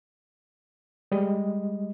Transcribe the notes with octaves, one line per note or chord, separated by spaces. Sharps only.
G3 G#3 D#5